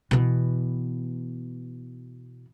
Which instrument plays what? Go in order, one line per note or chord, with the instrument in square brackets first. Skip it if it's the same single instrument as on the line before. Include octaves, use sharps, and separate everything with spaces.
[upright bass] B2 E3